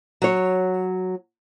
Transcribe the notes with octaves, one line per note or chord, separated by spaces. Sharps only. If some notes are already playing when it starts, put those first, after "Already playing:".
F#3 C#5